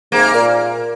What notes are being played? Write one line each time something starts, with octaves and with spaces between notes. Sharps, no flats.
G#2 C3 A#3
A#2